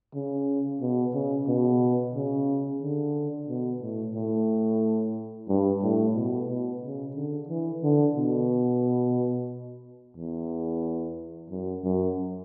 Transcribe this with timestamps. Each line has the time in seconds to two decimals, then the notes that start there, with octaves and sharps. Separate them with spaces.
0.15 C#3
0.81 B2
1.14 C#3
1.48 B2
2.15 C#3
2.82 D3
3.49 B2
3.82 A2
4.15 A2
5.49 G2
5.83 A2
6.15 B2
6.49 B2
6.82 C#3
7.16 D3
7.49 E3
7.83 D3
8.16 B2
10.17 E2
11.50 F#2
11.84 F#2